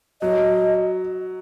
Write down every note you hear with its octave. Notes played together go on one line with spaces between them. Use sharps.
F#3 D#5